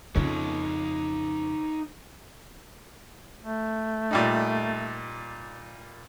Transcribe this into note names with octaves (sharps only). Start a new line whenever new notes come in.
F2 C#3 D#4 C#5
A3
A#2 G3 D#4